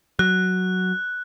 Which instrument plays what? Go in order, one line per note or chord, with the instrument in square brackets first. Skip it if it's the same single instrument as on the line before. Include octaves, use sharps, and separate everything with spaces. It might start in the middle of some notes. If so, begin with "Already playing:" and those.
[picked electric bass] F#3 [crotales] F#6